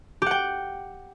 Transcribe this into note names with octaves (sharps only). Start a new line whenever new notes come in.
G4 F#5 G5